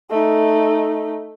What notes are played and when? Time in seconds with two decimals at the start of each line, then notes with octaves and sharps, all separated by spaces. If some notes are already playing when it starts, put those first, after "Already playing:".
0.11 A3 D#4